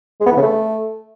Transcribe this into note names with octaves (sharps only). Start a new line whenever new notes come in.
G#3
B3
E3
C#3
A3